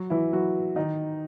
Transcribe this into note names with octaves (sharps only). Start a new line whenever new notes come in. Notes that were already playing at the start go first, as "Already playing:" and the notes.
Already playing: F#3 F#4
E3 E4
F#3 F#4
D#3 D#4